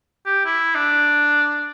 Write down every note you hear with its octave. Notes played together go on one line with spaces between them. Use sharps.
G4
E4
D4